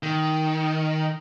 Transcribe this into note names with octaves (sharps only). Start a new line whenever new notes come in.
D#3